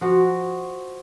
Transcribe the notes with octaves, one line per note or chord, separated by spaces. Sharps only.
F3 F#4